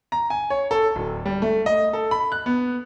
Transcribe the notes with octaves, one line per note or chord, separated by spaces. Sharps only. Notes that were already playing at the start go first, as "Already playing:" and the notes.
A#5
G#5
C#5
A4
D1
G3
A3
D#5
A4
B5
F#6
B3